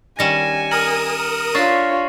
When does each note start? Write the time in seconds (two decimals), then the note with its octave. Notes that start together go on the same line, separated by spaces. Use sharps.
0.19 D#3 G3 C#4 G#5 A#6 C#7 E7
0.71 A#4 D#6 F6 A#6 D#7 F#7
1.55 D4 F4 C#5 E5 C#6 A6 C7